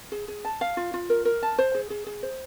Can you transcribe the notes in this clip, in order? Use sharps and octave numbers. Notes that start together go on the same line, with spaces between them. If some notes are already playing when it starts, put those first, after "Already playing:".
G#4
G#4
A5
F5
F4
F4
A#4
A#4
A5
C5
G#4
G#4
G#4
C5